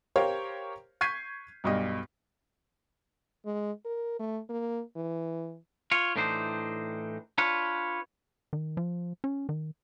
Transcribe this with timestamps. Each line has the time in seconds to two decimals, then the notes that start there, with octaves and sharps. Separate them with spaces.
0.16 G4 A#4 C5 C#5 F5
1.01 C#6 G6 G#6 B6 C7 D#7
1.64 B1 G2 D#5
3.45 G#3
3.85 A#4
4.19 A3
4.49 A#3
4.96 E3
5.91 F4 C#5
6.16 A2 E3 D4 D#4 C5
7.38 D4 F4 B4 C#5
8.53 D#3
8.77 F3
9.24 C#4
9.49 D#3